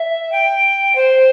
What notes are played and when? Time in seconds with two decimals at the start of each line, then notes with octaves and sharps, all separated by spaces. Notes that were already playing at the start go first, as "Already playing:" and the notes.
Already playing: E5
0.31 G5
0.95 C5